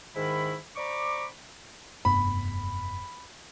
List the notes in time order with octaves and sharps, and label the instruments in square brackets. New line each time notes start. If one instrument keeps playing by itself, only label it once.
[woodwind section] G#2 D#3 E4 B5
C5 D5 A#5 B5 C#6 D6
[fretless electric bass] F1 G2 B3 [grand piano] B5